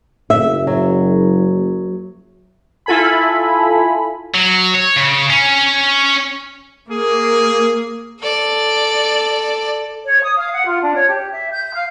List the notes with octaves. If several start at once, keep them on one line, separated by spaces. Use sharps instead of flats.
F#1 E5
F#3
E4 F4 A4 G#5 B5
F#3
C#5
C#3
C#4
A#3 G#4
A4 D5
C#5
D#6
F5
F#5
F4
D4
C#5
G4
E5
G6
F5